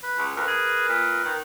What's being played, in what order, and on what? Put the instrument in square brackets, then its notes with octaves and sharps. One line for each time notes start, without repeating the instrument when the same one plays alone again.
[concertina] B4 B5
[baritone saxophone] C#2
[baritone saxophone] D2 [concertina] A#4 B4
[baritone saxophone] G#4
A#2
D#3